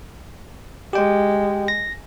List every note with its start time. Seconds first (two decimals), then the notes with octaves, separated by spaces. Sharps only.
0.93 G#3 G4 G5
1.68 A#6